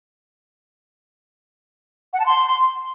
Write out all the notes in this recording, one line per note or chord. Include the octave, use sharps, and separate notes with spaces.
F#5
A5
C6